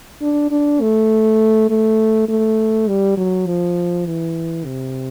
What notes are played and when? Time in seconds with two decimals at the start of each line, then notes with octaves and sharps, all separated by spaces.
0.22 D4
0.51 D4
0.81 A3
1.70 A3
2.29 A3
2.88 G3
3.17 F#3
3.46 F3
4.06 E3
4.65 C3